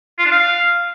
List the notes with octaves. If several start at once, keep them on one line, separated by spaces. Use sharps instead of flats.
F4
D4
F5